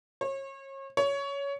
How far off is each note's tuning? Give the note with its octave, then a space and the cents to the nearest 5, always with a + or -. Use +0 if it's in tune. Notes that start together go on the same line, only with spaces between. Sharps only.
C#5 -35
C#5 +15